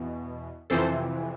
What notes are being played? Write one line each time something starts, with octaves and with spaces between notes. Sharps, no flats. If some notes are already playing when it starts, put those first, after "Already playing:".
Already playing: E2 B2
F2 C3 E3 A4 C5